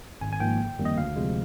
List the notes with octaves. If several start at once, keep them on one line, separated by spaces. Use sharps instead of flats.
G#1 G#5
G#5
G#2 F3 A#3 G5
G1
F2 D#3 G3 A#3
D#5
D2 F5
C3 F3 G#3